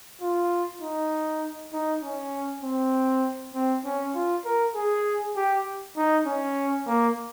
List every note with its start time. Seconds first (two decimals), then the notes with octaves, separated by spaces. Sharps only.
0.21 F4
0.82 D#4
1.73 D#4
2.03 C#4
2.63 C4
3.54 C4
3.85 C#4
4.15 F4
4.45 A#4
4.75 G#4
5.36 G4
5.97 D#4
6.26 C#4
6.87 A#3